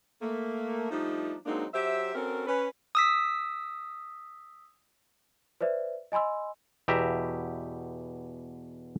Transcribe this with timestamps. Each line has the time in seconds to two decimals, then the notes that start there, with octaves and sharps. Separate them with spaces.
0.21 A3 A#3
0.91 F3 G3 A3 D4 D#4
1.46 F#3 G#3 A#3 C4 D4 D#4
1.74 F#3 G4 C5 E5
2.15 C4 C#4 F#4 A4 A#4
2.47 C#4 B4
2.95 D#6 E6 B6
5.61 B4 C5 D5 E5
6.12 D#5 G#5 B5 C6 E6
6.88 E2 B2 G4 E5 A#5